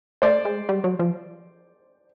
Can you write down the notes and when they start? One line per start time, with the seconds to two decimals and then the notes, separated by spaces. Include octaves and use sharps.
0.22 A3 C5 D5
0.45 G#3
0.69 G3
0.84 F#3
0.99 F3